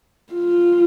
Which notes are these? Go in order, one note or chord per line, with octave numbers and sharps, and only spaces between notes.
F4